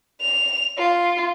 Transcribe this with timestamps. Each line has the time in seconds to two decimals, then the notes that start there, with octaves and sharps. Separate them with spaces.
0.22 F7
0.78 F4